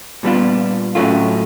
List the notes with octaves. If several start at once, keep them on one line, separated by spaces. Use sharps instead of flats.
A#2 G3 B3 D4 F4
A2 F#3 A3 C#4 F4